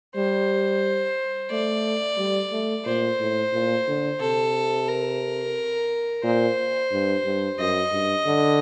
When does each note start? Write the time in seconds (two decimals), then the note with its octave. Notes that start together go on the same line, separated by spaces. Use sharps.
0.16 G3 C5
1.51 A3 D5
2.18 G3
2.52 A3
2.85 A#2 C5
3.20 A2
3.53 A#2
3.87 D3
4.21 C3 A4
4.88 A#4
6.24 A#2 C5
6.92 G2
7.25 G2
7.59 F#2 D#5
7.92 G2
8.27 D3